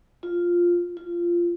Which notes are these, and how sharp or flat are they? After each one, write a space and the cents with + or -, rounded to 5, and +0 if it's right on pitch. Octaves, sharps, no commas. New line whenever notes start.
F4 +0
F4 -15